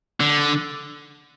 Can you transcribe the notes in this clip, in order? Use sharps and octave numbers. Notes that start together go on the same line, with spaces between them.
D3